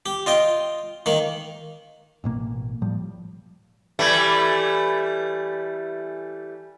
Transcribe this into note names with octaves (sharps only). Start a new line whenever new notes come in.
G4
F4 D#5 G5
D#3 A#3
A1 B2 A#3
A2 F3 G3
E3 G3 A3